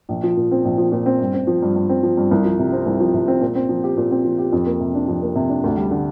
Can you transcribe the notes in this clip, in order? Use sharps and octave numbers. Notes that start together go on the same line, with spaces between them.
A#1
F3
A#2
C4
A#1
F3
A#2
C4
G2
C4
F3
G2
G2
C4
F3
G2
C2
F3
C3
C4
C2
F3
C3
C4
A#2
C4
F3
G4
A#2
C4
F3
G4
F2
A#3
C3
D4
F2
A#3
C3
D4
D2
G3
D3